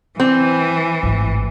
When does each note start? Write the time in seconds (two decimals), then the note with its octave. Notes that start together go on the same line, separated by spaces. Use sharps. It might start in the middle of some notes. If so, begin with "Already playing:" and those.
0.20 E3 C4
1.03 G#1 A2